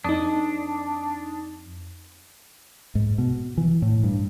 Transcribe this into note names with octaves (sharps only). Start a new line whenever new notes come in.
F2 D4 D#4 D#6
G#2
B2
E3
A2
G2